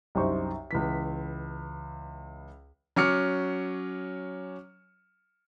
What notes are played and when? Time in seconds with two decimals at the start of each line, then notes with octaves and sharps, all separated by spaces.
0.15 C2 F#2 D#4 C5 C#6
0.71 C#2 E3 B6
2.96 F#3 C#4 D6 F6 C#7